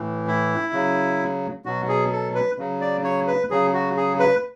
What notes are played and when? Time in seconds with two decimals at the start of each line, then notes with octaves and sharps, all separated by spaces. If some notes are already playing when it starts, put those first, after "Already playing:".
Already playing: A2 E3
0.27 E4
0.73 C#3 F#3
1.65 B2 F#3 F#4
1.88 G#4
2.12 A4
2.35 B4
2.59 C#3 F#3
2.81 D5
3.04 C#5
3.27 B4
3.50 C#3 F#3 G#4
3.73 F#4
3.97 G#4
4.19 B4